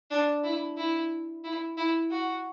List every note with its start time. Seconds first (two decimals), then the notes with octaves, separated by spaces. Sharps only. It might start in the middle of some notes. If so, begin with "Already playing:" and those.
0.10 D4
0.44 E4
0.77 E4
1.44 E4
1.77 E4
2.11 F#4